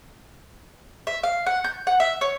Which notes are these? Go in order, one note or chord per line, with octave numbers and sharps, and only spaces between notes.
E5
F5
F#5
G6
F#5
E5
C#5